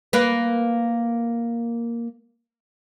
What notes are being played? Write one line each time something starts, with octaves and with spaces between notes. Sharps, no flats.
A#3 B4